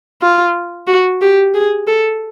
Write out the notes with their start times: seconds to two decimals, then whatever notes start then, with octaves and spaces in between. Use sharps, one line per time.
0.22 F4
0.87 F#4
1.21 G4
1.54 G#4
1.87 A4